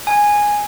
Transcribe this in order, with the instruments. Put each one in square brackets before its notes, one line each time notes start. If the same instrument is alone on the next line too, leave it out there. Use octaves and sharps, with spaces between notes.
[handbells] G#5